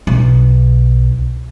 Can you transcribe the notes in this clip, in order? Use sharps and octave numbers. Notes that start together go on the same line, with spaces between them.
B1